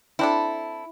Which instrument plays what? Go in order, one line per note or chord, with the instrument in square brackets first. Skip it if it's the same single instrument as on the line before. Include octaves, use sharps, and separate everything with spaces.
[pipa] C4 D4 A4 [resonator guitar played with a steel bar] E4